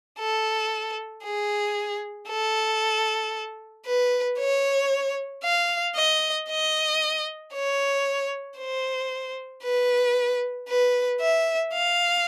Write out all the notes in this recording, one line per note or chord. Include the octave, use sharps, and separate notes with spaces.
A4
G#4
A4
B4
C#5
F5
D#5
D#5
C#5
C5
B4
B4
E5
F5